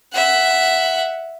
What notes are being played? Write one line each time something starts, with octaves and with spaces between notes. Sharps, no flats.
E5 F#5